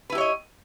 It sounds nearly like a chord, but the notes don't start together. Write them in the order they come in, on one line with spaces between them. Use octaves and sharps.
B4 E4 G4 C#5 D#5